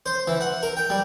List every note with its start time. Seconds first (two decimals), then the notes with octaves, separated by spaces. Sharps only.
0.06 C5
0.27 E3
0.41 F#5
0.63 A#4
0.77 G5
0.90 G3